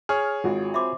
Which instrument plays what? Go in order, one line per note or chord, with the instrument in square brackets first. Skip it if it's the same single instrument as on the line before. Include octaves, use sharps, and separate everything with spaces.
[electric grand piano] G#4 C#5 [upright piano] F6
[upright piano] G#1 [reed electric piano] F4 F#4
[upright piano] C4 B5 [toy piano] E5 C6 D6